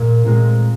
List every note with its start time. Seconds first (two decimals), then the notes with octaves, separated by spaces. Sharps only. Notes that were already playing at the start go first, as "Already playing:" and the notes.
Already playing: A#2 G#3
0.24 A#2 G#3 C4 F4 A#4